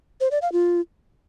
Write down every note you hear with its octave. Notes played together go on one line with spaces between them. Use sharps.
C5
D5
F5
F4